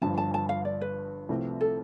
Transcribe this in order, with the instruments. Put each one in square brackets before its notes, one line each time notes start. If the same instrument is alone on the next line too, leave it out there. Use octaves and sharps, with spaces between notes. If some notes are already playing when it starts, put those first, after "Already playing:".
[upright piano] G1 G2 F3 [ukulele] A5
[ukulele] A5
A5
F5
D5
B4
[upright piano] C2 C3 F3 A3 C4
[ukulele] A4